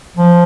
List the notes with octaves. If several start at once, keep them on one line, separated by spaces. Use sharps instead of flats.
F3